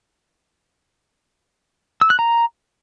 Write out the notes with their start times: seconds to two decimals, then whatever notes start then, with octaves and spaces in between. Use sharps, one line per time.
2.01 E6
2.10 F#6
2.19 A#5